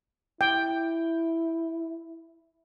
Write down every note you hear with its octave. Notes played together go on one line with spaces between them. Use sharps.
E4 G5